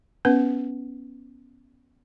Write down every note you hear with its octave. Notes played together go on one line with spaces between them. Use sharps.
B3 C#4 B4